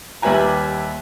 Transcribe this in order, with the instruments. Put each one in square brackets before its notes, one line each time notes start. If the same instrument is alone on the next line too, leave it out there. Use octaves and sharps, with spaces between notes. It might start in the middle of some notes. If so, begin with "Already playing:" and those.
[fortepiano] D#2 G3 B4 E5 G#5 A#5